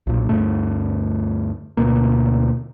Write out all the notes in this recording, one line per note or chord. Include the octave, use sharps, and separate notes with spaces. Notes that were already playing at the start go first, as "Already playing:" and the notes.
B1 A#2
D2 G2 A3
D2 B2 A#3